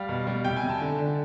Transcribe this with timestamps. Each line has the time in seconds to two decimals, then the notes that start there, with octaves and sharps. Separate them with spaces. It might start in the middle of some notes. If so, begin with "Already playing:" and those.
Already playing: G3 F5
0.09 B2
0.27 G3
0.44 C3 G5
0.56 G#5
0.63 C3
0.69 A5
0.81 D3
0.99 D3